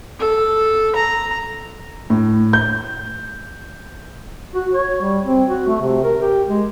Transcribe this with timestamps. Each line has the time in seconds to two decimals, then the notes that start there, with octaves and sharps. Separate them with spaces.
0.19 A4
0.95 A#5
2.10 A2
2.53 G6
4.54 F#4
4.73 C#5
5.01 G3
5.24 C4
5.48 F#4
5.67 A3
5.81 C3
6.04 A#4
6.22 G4
6.48 G#3